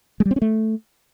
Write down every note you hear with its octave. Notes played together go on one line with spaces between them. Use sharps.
G#3
G3
C4
C#4
A3